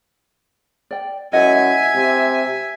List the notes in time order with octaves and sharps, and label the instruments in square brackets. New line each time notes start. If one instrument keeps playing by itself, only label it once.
[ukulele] D5 G5
[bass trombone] F#2 [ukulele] E4 D#5 F#5 [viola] E5 G#5
[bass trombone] C3